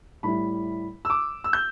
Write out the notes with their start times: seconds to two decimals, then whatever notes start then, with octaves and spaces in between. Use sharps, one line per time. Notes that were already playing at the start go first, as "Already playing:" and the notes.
0.23 A2 G3 E4 B5
1.05 E6
1.10 D6
1.44 E6
1.53 G6